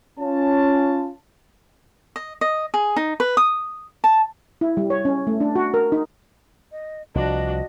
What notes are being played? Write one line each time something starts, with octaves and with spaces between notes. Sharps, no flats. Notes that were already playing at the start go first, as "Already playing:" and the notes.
C#4 F4 A5
D#5
D#5
G#4
D#4
B4
D#6
A5
E4
G3
C#5
C#4
A3
D4
F#4
A#4
D#4
D#5
C2 F3 D4 F#4 D#5